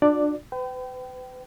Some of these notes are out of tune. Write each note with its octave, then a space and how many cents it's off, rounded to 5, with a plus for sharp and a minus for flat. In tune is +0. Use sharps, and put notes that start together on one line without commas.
D4 +20 F#4 -45 D5 +0
B4 +40 G5 -25